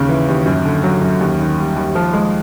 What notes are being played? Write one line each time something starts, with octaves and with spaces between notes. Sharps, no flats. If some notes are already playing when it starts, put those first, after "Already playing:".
Already playing: D#2 C#3 C#4
E3
D#2
F#2
D3
F#3
F#2
D#2
D#3
G3
D#2
F3
G#3